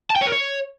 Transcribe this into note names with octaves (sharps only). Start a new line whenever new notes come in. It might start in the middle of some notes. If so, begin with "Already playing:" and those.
A5
G5
C#5
A#4
C#5